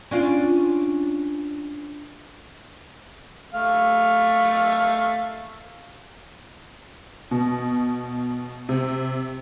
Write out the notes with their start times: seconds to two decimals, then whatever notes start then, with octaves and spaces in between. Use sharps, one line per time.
0.11 C#4 D4 F4
3.54 A3 F5
7.31 B2
8.69 C3